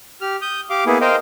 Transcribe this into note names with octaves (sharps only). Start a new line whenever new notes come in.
G4 F6
D#6 G6
G4 F5 D6
A#3 B3 E4 G#4
A#4 C5 D#5 F5 G5